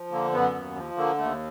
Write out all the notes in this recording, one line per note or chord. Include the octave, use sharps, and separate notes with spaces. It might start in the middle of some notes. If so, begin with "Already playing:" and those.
Already playing: F3
D3 A#3
F#2 B3
D#2
F3
D3 A#3
D#2 A3